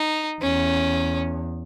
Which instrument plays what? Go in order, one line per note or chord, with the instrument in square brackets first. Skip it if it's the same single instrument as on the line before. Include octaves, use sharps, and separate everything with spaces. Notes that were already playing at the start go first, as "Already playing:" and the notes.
Already playing: [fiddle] D#4
[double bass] E2 [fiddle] C#4